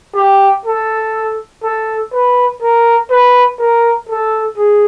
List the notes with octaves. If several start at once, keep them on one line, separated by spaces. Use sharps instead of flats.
G4
A4
A4
B4
A#4
B4
A#4
A4
G#4